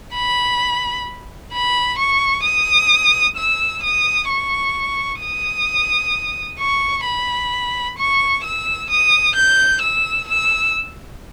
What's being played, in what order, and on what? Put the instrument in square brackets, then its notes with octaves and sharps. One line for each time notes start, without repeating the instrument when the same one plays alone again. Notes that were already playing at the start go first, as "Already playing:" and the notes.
[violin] B5
B5
C#6
D#6
E6
D#6
C#6
D#6
C#6
B5
C#6
E6
D#6
G6
E6
E6